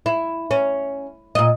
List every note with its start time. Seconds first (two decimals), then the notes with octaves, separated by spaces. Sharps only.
0.06 E4
0.51 C#4
1.35 A#2 D#5